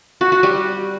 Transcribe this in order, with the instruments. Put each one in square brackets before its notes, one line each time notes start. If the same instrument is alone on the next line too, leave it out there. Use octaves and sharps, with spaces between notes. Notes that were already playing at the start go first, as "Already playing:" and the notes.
[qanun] F#4
F#4
G3